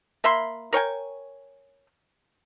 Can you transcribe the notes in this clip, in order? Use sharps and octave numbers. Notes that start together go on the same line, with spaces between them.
A#3 E5 B5 C6
A#4 C#5 G5 G#5